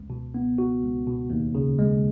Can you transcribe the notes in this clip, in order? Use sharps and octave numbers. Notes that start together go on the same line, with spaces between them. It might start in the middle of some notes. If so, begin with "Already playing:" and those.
Already playing: C#2
B2
B3
F#4
C#2
B2
D#2
C#3
G#3